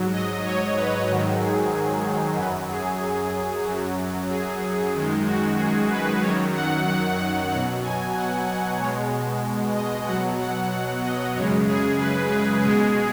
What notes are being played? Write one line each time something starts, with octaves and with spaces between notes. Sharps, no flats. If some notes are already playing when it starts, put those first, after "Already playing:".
Already playing: G#2 F#3
D#5
C#5
B4
G#2 D#3 F#3
G#4
G#4
F#2 F#3 B4
G#4
G#4
F#2 F#3
G#4
F#2 D#3 G#3
F#4
G#4
B4
F#2 D#3 F#3 C#5
F#5
F#5
F#5
B2 F#3 F#5
G#5
F#5
F#5
B2 G#3 C#5
D#5
B2 F#3 F#5
F#5
F#5
D#5
F#2 C#3 G#3 C#5
G#4
B4
G#4
B2 G#3 G#4